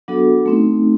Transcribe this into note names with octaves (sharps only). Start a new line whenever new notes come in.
F#3 B3 D4 F#4 A4
A3 C4 D#4